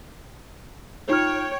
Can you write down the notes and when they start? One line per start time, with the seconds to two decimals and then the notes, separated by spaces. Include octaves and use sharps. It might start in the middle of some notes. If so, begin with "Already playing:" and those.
1.09 D#4 F4 C#5 G5 F6